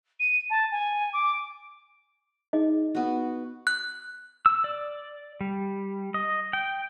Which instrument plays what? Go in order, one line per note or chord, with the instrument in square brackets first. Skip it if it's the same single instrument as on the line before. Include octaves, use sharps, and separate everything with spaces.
[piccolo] D#7
A5
G#5
D6
[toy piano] D#4 G#4 D#5
[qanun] B3 F#4
[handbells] F#6
[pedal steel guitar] E6
D5
G3
D#5
G5